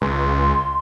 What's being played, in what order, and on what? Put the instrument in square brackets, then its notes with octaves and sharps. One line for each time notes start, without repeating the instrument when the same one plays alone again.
[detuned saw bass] C#2 [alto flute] C6